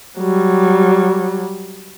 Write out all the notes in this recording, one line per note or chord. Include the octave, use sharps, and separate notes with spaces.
F#3 G3